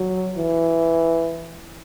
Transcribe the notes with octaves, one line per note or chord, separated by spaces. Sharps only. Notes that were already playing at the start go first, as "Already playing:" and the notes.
Already playing: F#3
E3